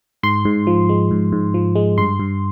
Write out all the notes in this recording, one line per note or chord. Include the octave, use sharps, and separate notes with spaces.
G#2 C6
G#2
F3
G#3
G#2
G#2
F3
G#3
G2 C6
G2